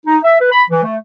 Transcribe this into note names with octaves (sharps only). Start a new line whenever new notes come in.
D#4
E5
B4
B5
E3
A3